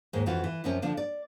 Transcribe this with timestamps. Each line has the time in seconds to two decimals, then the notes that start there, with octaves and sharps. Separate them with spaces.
0.13 D#2 G#2 G#3
0.26 F2 E3 F4 F#4
0.44 E3
0.64 F#2 C3 F3 C#4
0.82 D3 F3 D4
0.97 D5